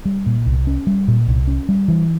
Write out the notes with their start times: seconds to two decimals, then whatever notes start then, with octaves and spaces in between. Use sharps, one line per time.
0.05 G3
0.26 A#2
0.46 C2
0.67 C#4
0.87 G3
1.08 A#2
1.27 C2
1.47 C#4
1.69 G3
1.88 E3